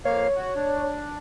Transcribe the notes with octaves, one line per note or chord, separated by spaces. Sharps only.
F2 A#3 C#5 F5
F#4
D4